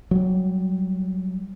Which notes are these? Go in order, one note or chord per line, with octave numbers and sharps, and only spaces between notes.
F#3 G3